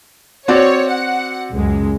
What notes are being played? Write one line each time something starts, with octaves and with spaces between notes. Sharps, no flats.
C4 F#4 C#5 D5
F#5
C#2 F#2 G#3